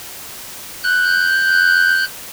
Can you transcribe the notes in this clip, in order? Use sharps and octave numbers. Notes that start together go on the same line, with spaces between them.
F#6 G6